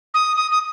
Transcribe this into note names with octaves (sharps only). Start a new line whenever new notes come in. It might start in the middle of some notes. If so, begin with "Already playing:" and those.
D#6
D#6
D#6